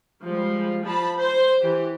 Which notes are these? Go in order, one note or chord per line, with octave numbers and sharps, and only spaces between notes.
F3 G3 G#3
F3 A5 B5
C5
E3 G4